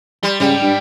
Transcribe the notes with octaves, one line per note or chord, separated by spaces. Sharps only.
G3 C6
G#2 C#3 G3 G5
G2